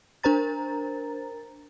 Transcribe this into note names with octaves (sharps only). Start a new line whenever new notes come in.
D4 A#4 C5 A#5 A6